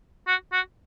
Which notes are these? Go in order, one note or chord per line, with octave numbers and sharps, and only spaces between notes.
F#4
F#4